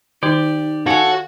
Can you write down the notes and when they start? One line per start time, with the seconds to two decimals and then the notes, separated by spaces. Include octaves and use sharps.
0.23 D#3 D#4 G4 D5
0.87 F#4 A4 C#5 F5 G#5